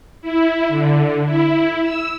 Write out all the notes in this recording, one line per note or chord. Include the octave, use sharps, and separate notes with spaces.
E4
D3
E4
E6